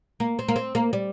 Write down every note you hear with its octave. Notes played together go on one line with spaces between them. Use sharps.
A#3
C4
A#3
C4
A#3
G3